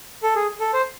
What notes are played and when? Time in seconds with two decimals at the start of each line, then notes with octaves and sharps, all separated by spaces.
0.23 A4
0.36 G#4
0.60 A4
0.73 C5